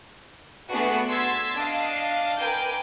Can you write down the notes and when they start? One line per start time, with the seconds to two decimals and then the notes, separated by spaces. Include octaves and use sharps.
0.69 A3 B3 D4 F#4 G#4 B4
1.09 C6 E6 G#6 A6 B6
1.56 D4 D#5 F5
2.37 A#4 B4 G5 G#5 D6 G6